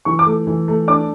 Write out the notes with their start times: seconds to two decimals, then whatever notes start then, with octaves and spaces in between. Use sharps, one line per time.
0.05 E3 C#6
0.19 D6
0.26 A3
0.47 E3
0.68 A3
0.88 D4 D6